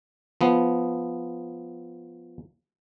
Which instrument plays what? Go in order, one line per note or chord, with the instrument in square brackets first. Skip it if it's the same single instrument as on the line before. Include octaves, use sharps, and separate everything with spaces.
[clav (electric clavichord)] F3 B3